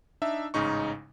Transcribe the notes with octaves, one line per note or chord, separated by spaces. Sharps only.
D4 D#4 E5
A1 G#2 C#3 D#4 C#6